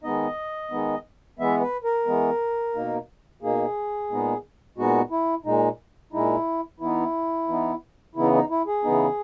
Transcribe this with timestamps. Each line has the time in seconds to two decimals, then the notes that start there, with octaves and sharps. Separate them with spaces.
0.03 D#3 G#3 B3 D#4 D#5
0.71 D#3 G#3 B3 D#4
1.39 E3 G#3 B3 E5
1.61 B4
1.84 A#4
2.06 E3 G#3 B3
2.75 B2 A#3 D#4
3.42 B2 A#3 D#4 G#4
4.10 A#2 G#3 B3 D#4
4.77 A#2 G#3 B3 D#4 F#4
5.11 E4
5.45 A#2 G#3 D#4
6.13 A#2 G#3 D#4 E4
6.80 E3 B3 D#4 E4
7.48 E3 B3 D#4
8.15 C#3 E3 B3 D#4 E4
8.33 D#4
8.50 E4
8.67 G#4
8.84 C#3 E3 B3 D#4